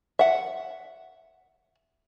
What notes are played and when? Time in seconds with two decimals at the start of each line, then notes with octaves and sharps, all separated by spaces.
0.19 E5 F#5